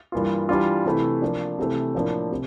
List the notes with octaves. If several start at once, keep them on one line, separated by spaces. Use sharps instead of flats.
G2 E3 A#3 F4
E3 G3 D4 F4
C3 E3 A3 E4
F3 A#3 D4
C3 E3 A3
A2 F3 A#3 D4
C3